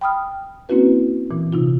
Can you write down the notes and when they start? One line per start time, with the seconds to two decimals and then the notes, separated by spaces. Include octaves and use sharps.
0.01 G5 B5 D#6 F6
0.69 A#3 C4 C#4 E4 F#4 B4
1.31 A#2 E3
1.53 C3 D#4 F4